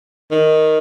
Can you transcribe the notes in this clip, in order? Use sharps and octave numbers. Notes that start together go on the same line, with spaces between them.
D#3